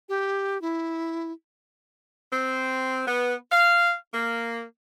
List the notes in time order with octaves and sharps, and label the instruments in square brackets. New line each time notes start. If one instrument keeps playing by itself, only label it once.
[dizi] G4
E4
[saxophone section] C4
B3
F5
A#3